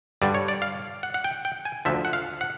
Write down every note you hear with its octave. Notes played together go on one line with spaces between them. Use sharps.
G2 D3 G3 D5
C#5
D5
F5
F#5
F#5
G5
G5
G#5
D2 D3 F3 E5
F#5
F5
F#5